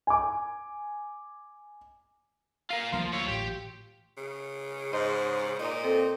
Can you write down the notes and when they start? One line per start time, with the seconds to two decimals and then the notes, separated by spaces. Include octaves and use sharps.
0.07 G#5 D6
2.70 F4 A#4 F5
2.93 D2 F3 F#3 A#3 F4
3.13 F4 C#5 E5
3.28 A1 G4
4.17 C#3
4.93 G#2 C5 D#5
5.59 A#2 D#4
5.84 C4 A4